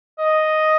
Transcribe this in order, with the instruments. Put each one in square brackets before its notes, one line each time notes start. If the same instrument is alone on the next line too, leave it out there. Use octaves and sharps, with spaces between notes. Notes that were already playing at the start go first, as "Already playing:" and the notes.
[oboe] D#5